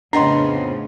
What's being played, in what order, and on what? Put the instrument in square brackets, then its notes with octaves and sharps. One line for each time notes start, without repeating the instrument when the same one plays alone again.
[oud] F2 B3 D#4 [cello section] A2 C#3 [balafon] D4 [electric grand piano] A#5 C6